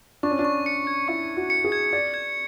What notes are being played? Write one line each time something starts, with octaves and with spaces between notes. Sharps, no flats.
D4 C#6
C#4
D4
C#6
C#7
G#6
E4 C#6
C#6
F#4
C#7
G#4
G#6
D5 G#6
G#6